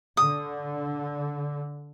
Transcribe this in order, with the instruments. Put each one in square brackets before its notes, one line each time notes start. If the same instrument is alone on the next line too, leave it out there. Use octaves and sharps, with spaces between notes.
[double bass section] D3 [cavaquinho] D#6